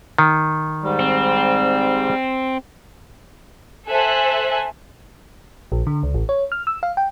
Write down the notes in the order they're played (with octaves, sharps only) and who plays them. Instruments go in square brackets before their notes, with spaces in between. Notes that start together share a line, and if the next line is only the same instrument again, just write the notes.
[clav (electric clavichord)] D#3
[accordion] G#2 G3
[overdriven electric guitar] C4
[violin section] A4 C5 E5 G#5 F#6
[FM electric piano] A#1
D3
C#2
A1
C#5
F6
E6
F5
G5